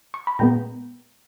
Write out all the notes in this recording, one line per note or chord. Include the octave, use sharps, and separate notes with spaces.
C#6
B5
A#2 G#3 B3 G5 A#5